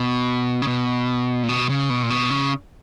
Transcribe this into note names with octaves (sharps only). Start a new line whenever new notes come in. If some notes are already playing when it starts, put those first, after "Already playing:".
Already playing: B2
C#3
B2
A#2
B2
C#3
B2
A#2
B2
C#3